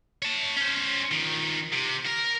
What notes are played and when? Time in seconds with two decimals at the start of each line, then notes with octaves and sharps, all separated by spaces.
0.22 C#5 A5
0.57 C#4 C5
1.11 D#3 F3
1.73 C3
2.06 A#4